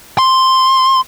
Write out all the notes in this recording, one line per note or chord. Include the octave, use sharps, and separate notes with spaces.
C6